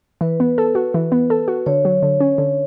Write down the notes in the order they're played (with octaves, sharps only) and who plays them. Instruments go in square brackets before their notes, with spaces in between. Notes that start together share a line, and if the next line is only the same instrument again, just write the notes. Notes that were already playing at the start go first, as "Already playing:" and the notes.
[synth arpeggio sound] E3 [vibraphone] B4
[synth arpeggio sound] B3
A4
F#4
E3
B3
A4
F#4
[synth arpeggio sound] D3 [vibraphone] C#5
[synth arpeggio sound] F#3
D3
C#4
D3